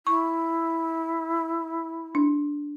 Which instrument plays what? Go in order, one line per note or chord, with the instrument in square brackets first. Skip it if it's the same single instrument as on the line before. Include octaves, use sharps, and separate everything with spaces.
[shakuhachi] E4 [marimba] C#6
[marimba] D4